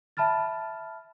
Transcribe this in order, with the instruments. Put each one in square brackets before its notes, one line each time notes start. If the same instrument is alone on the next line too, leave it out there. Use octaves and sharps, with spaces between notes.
[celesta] E5 A5 B5 F6 A6